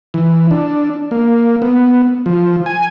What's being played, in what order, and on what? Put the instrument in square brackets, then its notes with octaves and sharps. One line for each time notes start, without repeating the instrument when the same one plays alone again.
[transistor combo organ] E3
D4
A#3
B3
F3
G#5